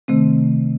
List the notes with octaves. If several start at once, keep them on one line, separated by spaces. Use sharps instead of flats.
C3 D#3 A3 C4